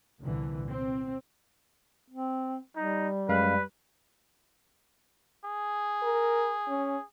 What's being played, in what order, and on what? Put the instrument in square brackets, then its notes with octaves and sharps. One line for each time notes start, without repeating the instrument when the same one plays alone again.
[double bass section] C2 A#2 D3 E3
C4
[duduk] C4
[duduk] G3 [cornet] D#4
[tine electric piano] F#2 G#3 F5 [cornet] B4
[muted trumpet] G#4
[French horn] A#4
C#4